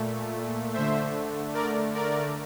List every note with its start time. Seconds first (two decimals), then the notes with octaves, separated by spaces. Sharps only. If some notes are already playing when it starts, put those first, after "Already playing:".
Already playing: A#2 A3
0.74 D3 A3 C5 E5
1.54 A#4 D5
1.94 A#4 D5